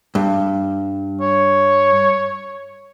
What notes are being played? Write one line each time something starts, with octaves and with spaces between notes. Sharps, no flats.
G2
C#5